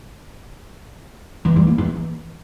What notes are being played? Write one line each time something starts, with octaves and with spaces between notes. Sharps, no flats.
E3
G3
A#3
E3